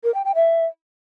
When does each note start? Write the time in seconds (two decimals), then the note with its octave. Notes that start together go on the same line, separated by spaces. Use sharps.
0.04 A#4
0.14 G5
0.25 G5
0.35 E5